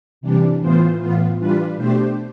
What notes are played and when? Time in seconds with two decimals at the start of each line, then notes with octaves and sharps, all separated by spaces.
0.21 C3 E3 G3 D4
0.60 A2 E3 B3 F4 C5
0.99 A2 E3 B3 F4
1.38 E3 G3 D4 F4 B4
1.76 B2 A3 D4 G4 C5